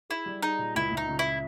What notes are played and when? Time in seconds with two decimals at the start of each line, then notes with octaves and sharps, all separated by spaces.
0.10 E4 G#4
0.26 G3
0.43 D#4 G#4
0.59 A#2
0.75 C#2 E4
0.91 C#2
0.97 D#4
1.08 C#3
1.19 E4